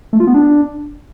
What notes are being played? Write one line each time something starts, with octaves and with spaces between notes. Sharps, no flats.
A3
F4
B3
D4